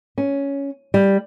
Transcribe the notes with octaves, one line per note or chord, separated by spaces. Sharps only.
C#4
G3